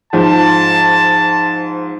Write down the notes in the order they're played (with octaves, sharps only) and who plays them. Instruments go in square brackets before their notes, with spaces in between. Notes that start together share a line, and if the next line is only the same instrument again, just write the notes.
[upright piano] G#2 F3 [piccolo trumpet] A5